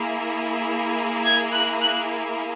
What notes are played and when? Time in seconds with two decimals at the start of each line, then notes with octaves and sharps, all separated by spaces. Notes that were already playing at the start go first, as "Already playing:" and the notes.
Already playing: A#3 E4 G#4
1.24 G#6
1.52 F#6
1.81 F#6